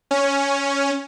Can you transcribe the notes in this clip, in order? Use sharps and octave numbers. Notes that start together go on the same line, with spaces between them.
C#4